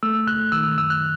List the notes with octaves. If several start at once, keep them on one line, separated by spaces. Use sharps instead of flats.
A3 E6
C#2 F#6
D#3 E6
F#2 E6
F#6